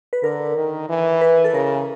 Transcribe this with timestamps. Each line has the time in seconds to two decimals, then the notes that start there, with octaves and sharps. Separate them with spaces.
0.13 B4
0.23 D3 A#4
0.56 D#3
0.89 E3
1.21 B4
1.44 A4
1.54 C#3 A#4